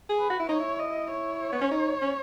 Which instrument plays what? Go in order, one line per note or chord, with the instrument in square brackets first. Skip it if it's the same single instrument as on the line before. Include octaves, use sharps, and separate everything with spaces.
[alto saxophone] G#4
[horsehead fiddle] B4
[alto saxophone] F#4
E4
[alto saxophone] D#4 [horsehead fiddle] C#5
[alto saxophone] E4
[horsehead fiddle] D#5
C#5
[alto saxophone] B3
C#4
D#4
C#4